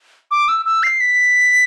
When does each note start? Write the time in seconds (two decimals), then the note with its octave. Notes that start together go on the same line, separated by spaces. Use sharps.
0.31 D6
0.48 E6
0.66 E6
0.83 C7
1.00 B6